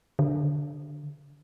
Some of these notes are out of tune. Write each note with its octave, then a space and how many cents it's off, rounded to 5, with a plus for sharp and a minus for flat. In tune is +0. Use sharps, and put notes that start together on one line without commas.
D3 +0